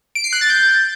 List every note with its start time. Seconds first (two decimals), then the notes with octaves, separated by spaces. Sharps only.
0.15 D7
0.24 C7
0.33 F#6
0.41 A6
0.50 G6